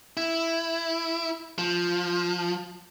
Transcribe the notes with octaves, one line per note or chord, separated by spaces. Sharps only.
E4
F3